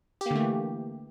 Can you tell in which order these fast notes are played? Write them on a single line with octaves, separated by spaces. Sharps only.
G4 A#3 D3 A3 E3